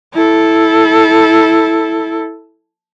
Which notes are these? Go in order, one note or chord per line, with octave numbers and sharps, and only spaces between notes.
E4 A4